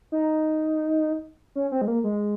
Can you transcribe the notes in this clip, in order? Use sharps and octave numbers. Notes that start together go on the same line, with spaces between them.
D#4
C#4
C4
G#3
A#3
G#3